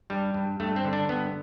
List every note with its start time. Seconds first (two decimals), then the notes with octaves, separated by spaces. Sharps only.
0.10 G2 G3
0.34 G2
0.60 G2 A3
0.76 C4
0.85 D3
0.93 D4
1.09 G2 B3